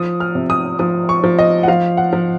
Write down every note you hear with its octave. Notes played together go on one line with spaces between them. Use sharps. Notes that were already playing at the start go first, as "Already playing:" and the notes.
Already playing: F3 D#6
F6
C3
D#6
F3 D#6
C#6
F3
D#5
F#5
F3 F5
F#5
F3